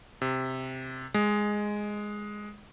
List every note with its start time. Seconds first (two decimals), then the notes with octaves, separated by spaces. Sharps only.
0.22 C3
1.14 G#3